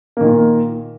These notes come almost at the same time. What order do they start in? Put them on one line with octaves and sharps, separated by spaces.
A#3 D#3 A#2